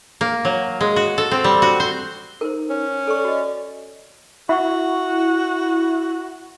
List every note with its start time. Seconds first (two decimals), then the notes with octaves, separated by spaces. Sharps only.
0.21 A#3
0.45 F#3
0.81 G#3
0.96 F#4
1.18 A4
1.31 C4
1.44 G3
1.62 F#4
1.80 C5
2.41 D#4 A#4 C5
2.70 C#4
3.07 A4 D5 C#6
3.25 F#4 D#5
4.49 E4 F#4 E5 F#5 C#6